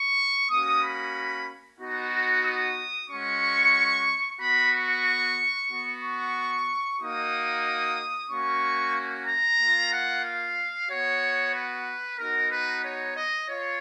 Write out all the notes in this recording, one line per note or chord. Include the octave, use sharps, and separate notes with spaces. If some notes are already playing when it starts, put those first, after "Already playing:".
Already playing: C#6
A#3 C#4 F#4 D#6
B5
B3 D#4 F#4
D#6
G#3 C#4 F#4 C#6
B3 F#4 B5
C#6
B3 F#4
C#6
A#3 D#4 F#4 D#6
A#3 C#4 F#4 C#6
A#5
A#3 F4
F#5
F5
B3 F#4 C#5
B4
B3 D#4 F#4 A#4
B4
C#5
D#5
F4 C#5